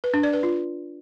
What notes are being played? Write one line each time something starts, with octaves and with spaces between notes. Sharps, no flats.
B4
D4
D5
B4
F4